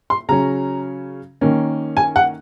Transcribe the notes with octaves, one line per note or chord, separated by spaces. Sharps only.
C6
C#3 F#3 C#4 A#5
D#3 A#3 C#4
G#5
F#5